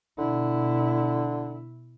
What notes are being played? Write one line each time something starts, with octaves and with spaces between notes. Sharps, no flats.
B2 D3 E4